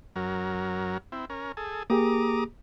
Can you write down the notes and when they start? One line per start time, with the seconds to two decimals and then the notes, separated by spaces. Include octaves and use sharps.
0.16 F#2 F#3 A#4
1.12 C4 E4
1.30 C#4 A#4
1.57 G#4 A4
1.90 A#3 G4 G#4 A#5 D6 D#6